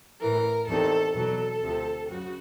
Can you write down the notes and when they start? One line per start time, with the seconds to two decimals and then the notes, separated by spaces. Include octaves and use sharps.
0.21 A2 E3 A#4
0.68 E2 C3 D#3 A4
1.15 E2 B2 F#3 A4
1.62 D2 C3 F3
2.08 F#2 C#3 F#4